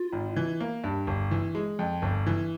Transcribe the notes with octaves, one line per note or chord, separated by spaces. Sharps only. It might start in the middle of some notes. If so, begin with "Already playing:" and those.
Already playing: F4
G#1
E3
A#3
G2
G1
E3
G#3
F2
G1
E3